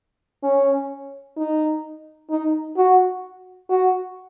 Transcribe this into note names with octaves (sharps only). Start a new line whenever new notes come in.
C#4
D#4
D#4
F#4
F#4